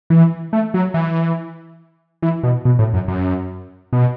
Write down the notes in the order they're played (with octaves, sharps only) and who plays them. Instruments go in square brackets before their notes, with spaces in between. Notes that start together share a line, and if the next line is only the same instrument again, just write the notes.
[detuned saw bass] E3
A3
F#3
E3
E3
B2
B2
A2
F#2
F#2
B2